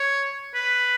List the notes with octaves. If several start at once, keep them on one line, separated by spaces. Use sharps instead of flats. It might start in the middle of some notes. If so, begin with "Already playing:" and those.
Already playing: C#5
B4